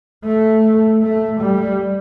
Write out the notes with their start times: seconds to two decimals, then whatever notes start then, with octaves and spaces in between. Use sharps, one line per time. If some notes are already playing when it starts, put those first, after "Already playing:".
0.24 A3
1.02 A3
1.41 G3